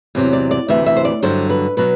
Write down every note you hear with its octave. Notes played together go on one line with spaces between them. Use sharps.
E2 C3 F#3
D5
D5
D2 C3 E3 E5
E5
C5
D5
G2 D3 F#3 C5
B4
B2 F#3 B4